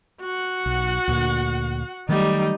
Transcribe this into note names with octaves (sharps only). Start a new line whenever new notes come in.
F#4 F#5
B1
D2 A#2 D3
D#3 F#3 G3 A3 D#4